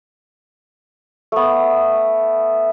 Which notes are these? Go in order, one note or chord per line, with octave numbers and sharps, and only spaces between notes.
A3 B3